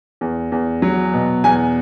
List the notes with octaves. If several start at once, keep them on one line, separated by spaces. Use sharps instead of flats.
E2
E2
F#3
B2
E2 G#5